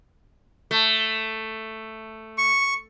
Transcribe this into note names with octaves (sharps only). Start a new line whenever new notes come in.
A3
C#6